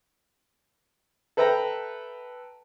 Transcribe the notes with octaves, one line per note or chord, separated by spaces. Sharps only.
A4 B4 E5 G5 A#5